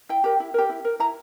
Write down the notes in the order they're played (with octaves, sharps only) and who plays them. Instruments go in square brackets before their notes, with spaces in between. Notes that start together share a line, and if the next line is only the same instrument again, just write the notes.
[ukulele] E4 G5
G4 A#4
E4
G4 A#4
E4
A#4
E4 A#5